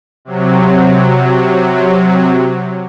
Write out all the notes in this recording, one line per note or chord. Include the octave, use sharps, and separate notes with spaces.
C3 F#3